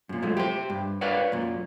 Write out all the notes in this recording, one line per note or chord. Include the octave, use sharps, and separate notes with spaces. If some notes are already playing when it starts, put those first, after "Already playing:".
F#2 A#2
F3 F#3 G#3 A3
G4 C5
G2
A#4 B4 C#5 D5 F5 F#5
F#2 A#2